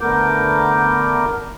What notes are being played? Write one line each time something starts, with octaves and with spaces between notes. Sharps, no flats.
D3 A3 B3 A#4 D6 G6